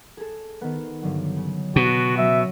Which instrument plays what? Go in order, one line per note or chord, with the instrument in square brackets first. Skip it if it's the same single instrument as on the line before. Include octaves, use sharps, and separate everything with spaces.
[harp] G#4 A4
D#3 B3
G2 D3 F#3
C#3
[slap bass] B2 [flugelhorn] F#4
[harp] F#3 C#4 [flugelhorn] E5